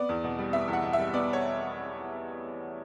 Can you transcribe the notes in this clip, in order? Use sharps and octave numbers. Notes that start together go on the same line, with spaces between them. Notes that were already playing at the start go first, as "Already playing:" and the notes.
Already playing: B3 D5
E2
B2
G3
B3 E5
E2
F#5
B2
E5
G3
B3 D5
C#5